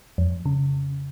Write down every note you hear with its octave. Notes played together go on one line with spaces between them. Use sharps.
F2
C#3